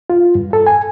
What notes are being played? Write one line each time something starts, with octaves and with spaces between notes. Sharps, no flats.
F4
G2
A4
G#5